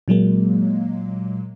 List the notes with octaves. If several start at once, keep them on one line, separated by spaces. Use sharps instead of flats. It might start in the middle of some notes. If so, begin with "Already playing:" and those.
A#2 F#3 G#3 A#3